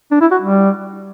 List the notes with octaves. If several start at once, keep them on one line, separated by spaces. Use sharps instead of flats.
D4
E4
F#4
G3